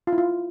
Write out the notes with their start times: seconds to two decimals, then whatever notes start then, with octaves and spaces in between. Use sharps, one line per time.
0.07 F4
0.13 E4
0.18 F4